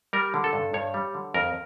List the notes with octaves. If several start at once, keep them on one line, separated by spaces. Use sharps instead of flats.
G3 A#4
D3
A4
G2
G2 C#5
G3
D3
F2 A#4